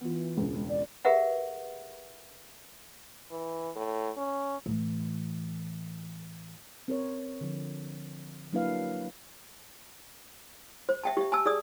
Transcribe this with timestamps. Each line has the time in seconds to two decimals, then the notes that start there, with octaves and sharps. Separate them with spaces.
0.01 E3 B3 F4
0.37 E1 C#2
0.54 G#3
0.69 D5
1.05 G4 G#4 A#4 B4 E5 F#5
3.31 E3
3.76 A2
4.17 C#4
4.66 A2 E3
6.88 C4 A#4 C#5
7.41 D3 F3
8.53 F#3 A#3 D4 E4 B4 F5
10.89 C5
11.04 E5 G5 A5
11.17 G4 E5
11.32 G#5 A5 E6
11.46 G#4 D5 D#6